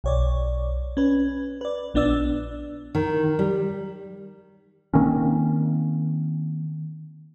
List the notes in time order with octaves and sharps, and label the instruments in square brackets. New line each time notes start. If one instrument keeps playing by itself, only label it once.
[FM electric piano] B1 C#5 D5
C#4 B4
B4 D5
A#1 B3 D4 D5 E6
[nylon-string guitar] D#3
G3
[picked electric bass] D#3 A#3 C4 C#4